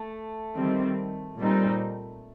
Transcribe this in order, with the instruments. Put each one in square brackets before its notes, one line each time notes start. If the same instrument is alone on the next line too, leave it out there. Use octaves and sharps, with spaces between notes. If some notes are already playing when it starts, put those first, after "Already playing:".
Already playing: [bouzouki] A3
[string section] D#3 G3 C4
A#2 G3 C4 D#4